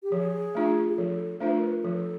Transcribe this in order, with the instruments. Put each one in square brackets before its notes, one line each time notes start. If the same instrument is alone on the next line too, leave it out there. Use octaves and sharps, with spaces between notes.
[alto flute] G4
[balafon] F3 [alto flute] G#4
[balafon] A3 D4 F4
[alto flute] G#4
[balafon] F3 [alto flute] A4
[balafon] A3 D4 F4 [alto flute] C5
[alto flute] B4
A#4
B4
[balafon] F3 [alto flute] A4